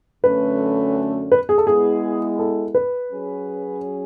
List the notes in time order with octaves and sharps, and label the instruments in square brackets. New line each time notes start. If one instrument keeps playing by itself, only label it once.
[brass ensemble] F#2 D3 F#3 A3 C#4 [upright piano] B4
[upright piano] B4
G#4
A4
[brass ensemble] G#3 B3 E4 [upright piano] G#4
[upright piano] A4
B4
[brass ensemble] F#3 C#4 G#4